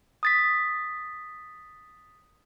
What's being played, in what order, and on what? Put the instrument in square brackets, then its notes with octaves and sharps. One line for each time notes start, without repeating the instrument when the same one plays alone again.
[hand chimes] D#6 A6 B6